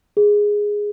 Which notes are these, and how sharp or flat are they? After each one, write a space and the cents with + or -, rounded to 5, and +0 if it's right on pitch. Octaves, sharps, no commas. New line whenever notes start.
G#4 -5